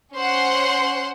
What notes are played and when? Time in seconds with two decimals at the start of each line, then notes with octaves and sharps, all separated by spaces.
0.16 C#4 C5 F#5 C6